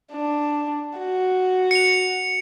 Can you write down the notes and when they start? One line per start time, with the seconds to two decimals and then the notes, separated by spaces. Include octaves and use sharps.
0.12 D4
0.98 F#4
1.71 C#7 F7